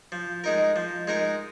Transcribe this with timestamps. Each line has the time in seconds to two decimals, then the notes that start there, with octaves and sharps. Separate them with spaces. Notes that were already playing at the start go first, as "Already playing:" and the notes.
0.12 F3
0.44 G#3 D#4 A#4
0.76 F3
1.08 G#3 D#4 A#4